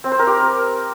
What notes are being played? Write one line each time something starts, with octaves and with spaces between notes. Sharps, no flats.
C4
C5
A#4
G4